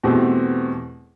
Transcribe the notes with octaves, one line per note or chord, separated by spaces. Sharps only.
E2 B2 A3 C4 G4